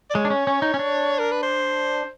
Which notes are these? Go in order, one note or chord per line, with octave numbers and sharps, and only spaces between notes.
D5
G#3 C#5
D4
C#4
C#4
D#4
C#4
D4
A#4
B4
C5